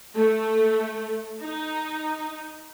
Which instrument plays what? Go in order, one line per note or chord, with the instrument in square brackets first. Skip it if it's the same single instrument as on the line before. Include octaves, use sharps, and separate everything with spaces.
[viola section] A3
D#4